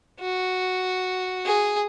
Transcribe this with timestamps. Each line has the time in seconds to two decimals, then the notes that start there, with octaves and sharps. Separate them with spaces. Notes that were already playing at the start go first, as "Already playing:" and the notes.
0.20 F#4
1.45 G#4